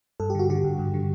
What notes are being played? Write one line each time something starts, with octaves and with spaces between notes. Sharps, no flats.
G2 A4
G4
D3 F#4
D3 G4
G2
G2
D3